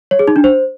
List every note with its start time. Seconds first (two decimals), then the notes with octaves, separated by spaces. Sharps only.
0.11 C#5
0.19 G#4
0.28 D#4
0.36 D4
0.44 C5